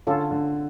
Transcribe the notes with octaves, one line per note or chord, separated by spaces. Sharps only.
D3 C#4 F4 A4
D3